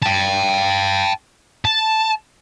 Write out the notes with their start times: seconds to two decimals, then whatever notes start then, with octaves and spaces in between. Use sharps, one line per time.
0.02 G5 A5
1.65 A5